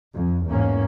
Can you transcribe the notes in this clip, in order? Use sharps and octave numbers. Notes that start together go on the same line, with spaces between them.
F2
E2 G#2 A#3 C#4